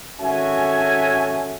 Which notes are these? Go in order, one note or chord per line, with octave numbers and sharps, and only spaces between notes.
G#1 C#4 F#4 A4 E5 G#5